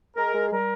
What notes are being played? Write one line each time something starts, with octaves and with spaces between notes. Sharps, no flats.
G#3 A#4
G#3
G#4
G3 A#4